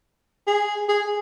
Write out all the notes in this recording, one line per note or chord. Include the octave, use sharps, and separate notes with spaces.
G#4
G#4